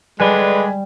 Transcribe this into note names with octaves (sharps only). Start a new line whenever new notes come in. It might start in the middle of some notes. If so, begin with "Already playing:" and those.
D3 G3 G#3 D4 B4 G#5 B5